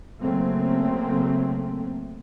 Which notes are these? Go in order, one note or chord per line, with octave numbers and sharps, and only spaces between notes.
C#3 F#3 A3 A#3 C4